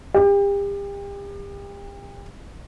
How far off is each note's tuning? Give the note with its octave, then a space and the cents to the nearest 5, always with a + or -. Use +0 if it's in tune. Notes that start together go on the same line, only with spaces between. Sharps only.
G4 +35